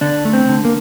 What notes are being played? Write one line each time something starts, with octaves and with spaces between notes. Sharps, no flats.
D3 D4
A3
C4
D3
A#3